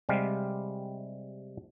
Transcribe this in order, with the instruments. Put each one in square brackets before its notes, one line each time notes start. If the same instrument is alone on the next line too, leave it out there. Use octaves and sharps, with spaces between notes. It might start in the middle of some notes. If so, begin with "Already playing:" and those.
[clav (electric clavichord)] C3 G3 G#3 F5